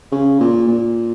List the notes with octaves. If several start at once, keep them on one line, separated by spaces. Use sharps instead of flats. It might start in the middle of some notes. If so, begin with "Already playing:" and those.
C#3
A#2
A#2